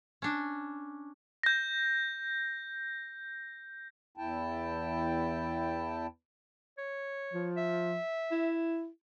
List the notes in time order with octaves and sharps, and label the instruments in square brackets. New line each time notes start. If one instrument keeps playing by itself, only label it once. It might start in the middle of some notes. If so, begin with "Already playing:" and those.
[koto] C#4 D4
[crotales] G6 A#6
[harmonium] E2 E4 G5 A5
[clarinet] C#5
[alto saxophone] F3
[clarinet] E5
[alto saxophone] E4